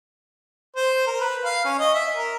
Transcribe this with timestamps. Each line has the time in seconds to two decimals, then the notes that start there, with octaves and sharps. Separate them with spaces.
0.76 C5
1.07 A#4
1.20 B4
1.45 F5
1.65 C#4
1.79 D#5
1.94 E5
2.16 A#4